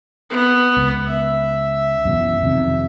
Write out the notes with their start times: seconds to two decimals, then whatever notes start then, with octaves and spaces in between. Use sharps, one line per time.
0.30 B3
0.77 C#2
1.07 E5
2.05 F#2 B2 E3
2.42 F2 C3 D#3